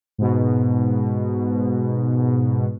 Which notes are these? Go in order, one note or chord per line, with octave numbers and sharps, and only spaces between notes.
G#2 B2